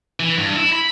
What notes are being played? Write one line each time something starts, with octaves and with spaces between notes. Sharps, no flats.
E3
G2
E4
B5